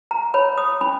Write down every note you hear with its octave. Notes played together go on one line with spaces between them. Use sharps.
A#5
C#5 B5
D#6
C#4 B5